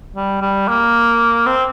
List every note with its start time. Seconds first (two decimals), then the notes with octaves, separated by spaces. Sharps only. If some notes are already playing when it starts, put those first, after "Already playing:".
0.15 G3
0.42 G3
0.68 A#3
1.46 C4